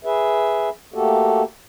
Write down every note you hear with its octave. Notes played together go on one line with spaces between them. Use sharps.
G#4 B4 E5
A3 A#3 F#4 G4 A4